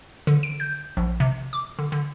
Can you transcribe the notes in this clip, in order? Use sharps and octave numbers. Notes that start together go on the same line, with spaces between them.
D3
D7
G6
A#1
C3
D6
D3
D3